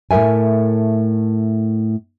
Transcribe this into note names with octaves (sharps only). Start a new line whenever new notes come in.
A2 A3 A#4 E5 G#5